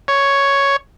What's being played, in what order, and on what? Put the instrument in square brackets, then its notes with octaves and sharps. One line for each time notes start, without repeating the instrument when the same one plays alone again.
[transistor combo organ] C#5